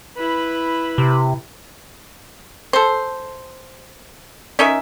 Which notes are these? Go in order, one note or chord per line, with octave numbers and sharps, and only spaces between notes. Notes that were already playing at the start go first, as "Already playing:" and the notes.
E4 B4
C3
A4 C5
C#4 D#4 A#4 E5